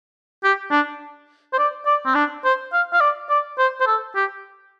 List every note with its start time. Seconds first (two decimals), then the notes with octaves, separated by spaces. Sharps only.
0.44 G4
0.72 D4
1.53 C5
1.58 D5
1.86 D5
2.06 C4
2.15 D4
2.44 C5
2.73 F5
2.93 F5
3.01 D5
3.30 D5
3.58 C5
3.80 C5
3.87 A4
4.16 G4